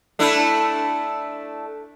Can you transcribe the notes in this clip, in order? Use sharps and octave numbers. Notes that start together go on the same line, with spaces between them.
A3 D4 E4